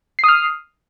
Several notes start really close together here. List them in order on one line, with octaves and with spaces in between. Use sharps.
C7 D#6 F6